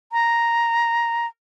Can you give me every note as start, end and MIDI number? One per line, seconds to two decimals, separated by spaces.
0.12 1.27 82